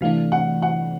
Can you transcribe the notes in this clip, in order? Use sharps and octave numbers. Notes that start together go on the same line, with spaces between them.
C3 E3 A3 D4 F5
F#5
F#5